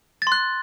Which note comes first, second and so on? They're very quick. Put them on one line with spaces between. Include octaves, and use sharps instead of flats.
A6 C6 F#6